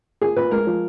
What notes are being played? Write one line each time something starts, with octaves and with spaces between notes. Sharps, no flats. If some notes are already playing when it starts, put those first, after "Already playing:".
A#2 G#4
A#2 B4
G#3 A#4
F3